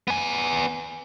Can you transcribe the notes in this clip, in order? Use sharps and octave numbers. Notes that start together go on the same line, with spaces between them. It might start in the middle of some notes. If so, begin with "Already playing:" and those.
B3 G#5